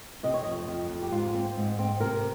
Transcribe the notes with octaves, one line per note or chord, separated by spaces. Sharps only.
C3 D#5
C#5
F2 D#5
F2
F2
G4
G#2 F4
C4
G#2
C4
C3 A#4